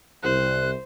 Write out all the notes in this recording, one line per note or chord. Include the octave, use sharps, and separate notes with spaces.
C2 C5 F#6